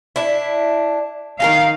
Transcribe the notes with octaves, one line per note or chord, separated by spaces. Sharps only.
D4 E4
D#3 D#4 G#4 A#4 F5